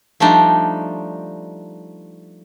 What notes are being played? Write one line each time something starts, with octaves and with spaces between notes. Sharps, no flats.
F3 G3 A3 D4 D#4